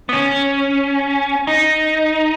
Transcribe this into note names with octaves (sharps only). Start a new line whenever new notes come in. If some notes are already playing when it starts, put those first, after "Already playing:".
B3
C#4
D#4